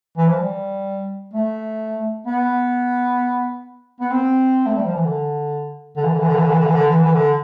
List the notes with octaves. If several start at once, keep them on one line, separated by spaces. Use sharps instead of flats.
E3
F3
G3
A3
B3
B3
C4
A3
G3
F3
E3
D3
D3
E3
D3
E3
D3
E3
D3
E3
D3
E3
D3
E3
E3
D3